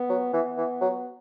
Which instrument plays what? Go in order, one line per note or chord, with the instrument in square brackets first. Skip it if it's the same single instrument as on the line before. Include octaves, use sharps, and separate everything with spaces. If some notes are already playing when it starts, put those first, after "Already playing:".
Already playing: [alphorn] B3
[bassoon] F#3
[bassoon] E3 [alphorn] B3
[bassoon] E3
F#3